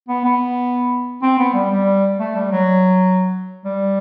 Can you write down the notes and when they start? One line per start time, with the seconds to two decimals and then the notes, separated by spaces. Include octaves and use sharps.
0.08 B3
0.24 B3
1.22 C4
1.38 B3
1.54 G3
1.70 G3
2.19 A3
2.35 G3
2.51 F#3
3.65 G3